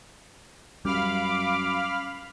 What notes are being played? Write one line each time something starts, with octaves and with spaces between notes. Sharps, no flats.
F#2 G3 F5 B5 D6 F6